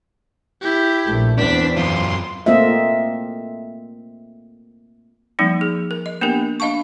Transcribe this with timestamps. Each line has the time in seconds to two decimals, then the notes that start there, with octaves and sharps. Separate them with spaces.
0.61 E4 G4
1.05 A#1 A3
1.38 E2 C4 D4 B6
1.77 F#2 F4 C6
2.46 A3 A#3 C4 F4 D#5 E5
5.39 F3 G3 A#3 C4 D#4
5.61 G#4
5.91 A#4
6.06 D#5
6.21 A#3 B3 D4 G4 A#4
6.60 D4 D#5 F5 A5 C#6